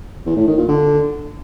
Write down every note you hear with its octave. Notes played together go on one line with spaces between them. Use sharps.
E2
A2
D#3
A#2
D3